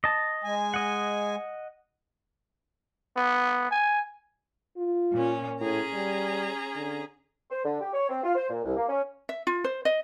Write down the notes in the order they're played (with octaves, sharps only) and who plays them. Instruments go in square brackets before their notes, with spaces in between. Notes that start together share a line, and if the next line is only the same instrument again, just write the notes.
[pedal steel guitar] D#5 A5
[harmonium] G#3 G#5
[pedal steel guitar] D#5 F#5
[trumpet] B3
G#5
[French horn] F4
[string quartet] A#2 C#4
[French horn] A2 [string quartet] C#4 G#4 A#5
[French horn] G3
D3
[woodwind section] C5
D3
G4
C#5
C4
F4
C5
A#2
C2
A#3
C#4
[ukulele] E5
F4
C5
D#5